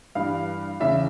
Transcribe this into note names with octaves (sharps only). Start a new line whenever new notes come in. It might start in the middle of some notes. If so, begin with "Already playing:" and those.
G2 E3 G3 F5
E2 C#3 E3 E5